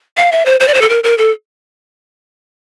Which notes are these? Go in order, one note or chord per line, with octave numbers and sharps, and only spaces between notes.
F5
E5
C5
C5
D5
C5
A4
A#4
A#4
A4